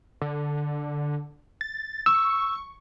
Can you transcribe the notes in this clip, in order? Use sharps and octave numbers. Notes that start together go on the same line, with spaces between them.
D3
A6
C#6 E6